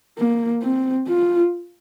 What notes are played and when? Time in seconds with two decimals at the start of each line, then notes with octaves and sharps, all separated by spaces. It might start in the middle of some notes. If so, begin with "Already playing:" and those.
0.18 A#3
0.62 C4
1.08 F4